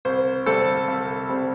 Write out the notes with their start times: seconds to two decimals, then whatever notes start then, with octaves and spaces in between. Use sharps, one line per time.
0.05 C2 C5
0.46 C3 G3 C4 A4
0.88 C2
1.29 C3 G3 C4